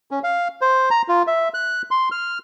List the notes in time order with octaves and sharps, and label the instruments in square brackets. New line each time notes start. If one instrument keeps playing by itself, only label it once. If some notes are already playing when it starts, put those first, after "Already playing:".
[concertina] C#4
F5
C5
A#5
F4
E5
F#6
C6
F6